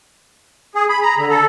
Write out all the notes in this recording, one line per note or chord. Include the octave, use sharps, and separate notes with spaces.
G#4
B5
A#5
D3
A4